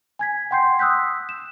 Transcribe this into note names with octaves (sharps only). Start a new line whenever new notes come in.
G#5 G#6 B6
F#5 G5 C6 G6 C7
D#6 E6 F#6 G6 B6
E7